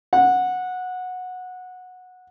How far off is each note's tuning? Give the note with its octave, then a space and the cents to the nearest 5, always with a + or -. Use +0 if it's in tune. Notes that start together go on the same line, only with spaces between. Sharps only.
F#5 -15